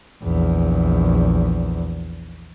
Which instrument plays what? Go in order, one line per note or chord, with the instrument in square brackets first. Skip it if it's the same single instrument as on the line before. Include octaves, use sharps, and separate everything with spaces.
[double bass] A#1 E2